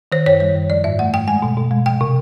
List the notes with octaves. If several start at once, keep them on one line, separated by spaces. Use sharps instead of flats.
D#3 C5
F#2 C#5
G3 C#5
F#2
F3 D5
G#2 E5
A3 F#5
G#2 G5
G#3 G#5
B2
B2
G#3
F3 G5
C3